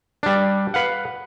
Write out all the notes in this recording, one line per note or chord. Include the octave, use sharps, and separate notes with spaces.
G3 D4
B4 F5 F#5